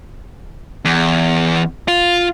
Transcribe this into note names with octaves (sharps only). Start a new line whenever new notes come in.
E2
F4